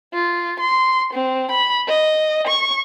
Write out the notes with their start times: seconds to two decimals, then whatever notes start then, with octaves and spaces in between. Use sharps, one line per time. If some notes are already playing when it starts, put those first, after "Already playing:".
0.14 F4
0.60 C6
1.13 C4
1.51 B5
1.88 D#5
2.47 C#6